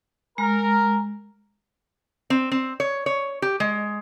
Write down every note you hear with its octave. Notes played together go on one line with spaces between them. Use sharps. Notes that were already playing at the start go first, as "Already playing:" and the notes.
G#3 A#4
C4
C4
C#5
C#5
G4
G#3